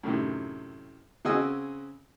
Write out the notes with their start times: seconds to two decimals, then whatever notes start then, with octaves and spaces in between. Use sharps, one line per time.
0.03 F#2 A2 C3 D#3
1.25 C#3 C4 F#4 D#5 G#5 E6